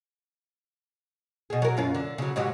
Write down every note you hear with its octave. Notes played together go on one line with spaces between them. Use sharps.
B2 G#4
F#3 A#4
F#2 C#4 F4
D3
C#3 F#3
G#2 F#3 G4